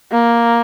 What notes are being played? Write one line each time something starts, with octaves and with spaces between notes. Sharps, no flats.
A#3